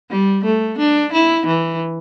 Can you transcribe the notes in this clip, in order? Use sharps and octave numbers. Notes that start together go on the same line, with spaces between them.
G3
A3
D4
E4
E3